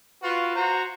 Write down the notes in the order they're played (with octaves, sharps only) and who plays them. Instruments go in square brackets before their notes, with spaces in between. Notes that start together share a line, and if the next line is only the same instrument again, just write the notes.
[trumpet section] F4 F#4 B4
F#4 C5 A#5